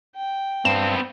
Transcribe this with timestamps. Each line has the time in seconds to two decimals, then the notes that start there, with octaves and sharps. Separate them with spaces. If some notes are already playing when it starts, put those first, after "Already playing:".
0.16 G5
0.65 G2 B3 C4 E7